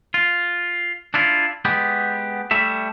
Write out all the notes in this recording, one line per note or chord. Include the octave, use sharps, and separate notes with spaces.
F4
D4 E4 F4
G#3 B3 G4
G3 A3 E5